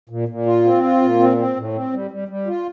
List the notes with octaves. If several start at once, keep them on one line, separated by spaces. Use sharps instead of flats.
A#2
A#2
F4
C4
F4
A#2
C4
C4
A2
C4
G3
G3
G3
F4